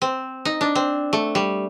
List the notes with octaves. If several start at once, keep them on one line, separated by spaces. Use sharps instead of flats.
C4
D#4
D4
C4
A3
G3